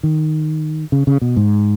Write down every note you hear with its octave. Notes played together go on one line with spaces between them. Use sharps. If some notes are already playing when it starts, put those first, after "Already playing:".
D#3
C#3
C#3
B2
G#2